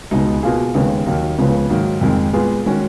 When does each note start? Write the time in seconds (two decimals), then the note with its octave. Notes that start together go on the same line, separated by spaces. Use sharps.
0.11 C#2 B2 G#3 D#4
0.43 B2 A#3 F4 G#4
0.74 D#2 C#3 G#3 B3 D#4
1.06 D#2 D#3 F#3 A#3 D#4
1.38 C#2 C#3 F3 G#3 B3
1.70 G#2 D#3 F#3 A#3
2.01 F2 D#3 G#3
2.33 A#2 G#3 B3 F4 G#4
2.66 D#3 G#3 C#4 F#4